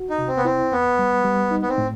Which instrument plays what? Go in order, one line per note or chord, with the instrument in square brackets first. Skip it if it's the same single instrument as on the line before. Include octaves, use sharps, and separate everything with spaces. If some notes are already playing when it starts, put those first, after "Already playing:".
Already playing: [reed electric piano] F#4
[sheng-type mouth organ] D#4
[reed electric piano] C3
[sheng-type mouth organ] C4
B3
[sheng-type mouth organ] C4 [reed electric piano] E4
[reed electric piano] E2 [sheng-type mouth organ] B3
[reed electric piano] G3
G3
D#4
[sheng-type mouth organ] B3
C4
[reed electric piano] A2